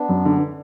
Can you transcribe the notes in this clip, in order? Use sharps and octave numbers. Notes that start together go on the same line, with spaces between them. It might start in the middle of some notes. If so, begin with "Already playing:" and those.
Already playing: B3 D4
F#2
D3